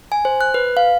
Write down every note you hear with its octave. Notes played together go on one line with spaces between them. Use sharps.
G#5
C5
F#6
B4
F5